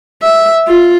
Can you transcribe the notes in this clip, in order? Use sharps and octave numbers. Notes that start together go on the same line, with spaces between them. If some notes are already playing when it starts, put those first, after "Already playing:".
E5
F4